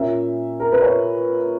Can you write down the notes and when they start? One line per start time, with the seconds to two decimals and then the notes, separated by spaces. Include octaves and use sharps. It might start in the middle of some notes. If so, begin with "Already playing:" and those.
Already playing: A#2 A#3 C#4 E5
0.60 A#4
0.72 B4
0.82 C#5